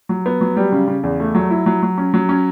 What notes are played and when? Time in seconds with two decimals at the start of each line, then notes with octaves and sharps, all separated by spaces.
0.09 F#3
0.26 B3
0.41 F#3
0.57 G3
0.72 C#3
0.87 C#3
1.03 E2
1.20 A3
1.35 F#3
1.50 E4
1.66 F#3
1.83 F#3
1.98 C#4
2.14 F#3
2.29 C#4